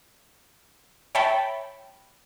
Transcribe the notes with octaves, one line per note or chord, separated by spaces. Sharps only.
C#5 E5 G5 A5 B5